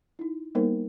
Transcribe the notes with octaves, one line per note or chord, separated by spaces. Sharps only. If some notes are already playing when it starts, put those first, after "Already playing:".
D#4 E4
G3 A#3 B3 D#4 A#4 C5